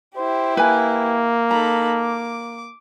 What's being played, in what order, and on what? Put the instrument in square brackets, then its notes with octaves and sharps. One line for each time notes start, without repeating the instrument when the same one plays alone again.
[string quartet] E4 G4 [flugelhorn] C5
[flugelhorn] A#3 [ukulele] B4 G#5
[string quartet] D#4 A4 B5 [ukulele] A#5
[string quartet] D6